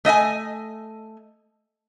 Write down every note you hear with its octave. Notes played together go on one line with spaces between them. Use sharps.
A3 D#5 E5 G#5